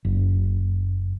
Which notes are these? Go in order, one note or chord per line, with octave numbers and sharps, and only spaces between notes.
F#1